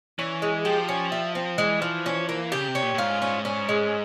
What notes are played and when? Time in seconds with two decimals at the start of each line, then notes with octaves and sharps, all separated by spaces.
0.19 E3 C#4
0.42 G#3
0.65 F3 G4
0.89 C#4
1.12 E4
1.35 C4
1.58 E3 G#3
1.82 F3
2.06 C#4
2.29 A#3
2.52 C#3 G4
2.68 C3
2.75 C#4
2.83 A#2
2.94 A#2
2.98 G#2 F4
3.22 C#4
3.45 C#4
3.69 G#3